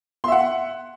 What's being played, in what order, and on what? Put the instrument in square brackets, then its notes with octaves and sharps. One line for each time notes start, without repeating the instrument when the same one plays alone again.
[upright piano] C6
E5
F#5